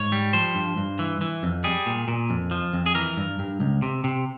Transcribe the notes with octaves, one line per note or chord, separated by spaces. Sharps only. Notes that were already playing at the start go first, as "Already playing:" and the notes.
Already playing: G#2 C#5
G3
F3 C5
G2
G2
E3
E3
F2
G3 G#4
A#2
A#2
F2
F3
F2
G#4
E3 A#4
G2
G2
C#2
C3
C3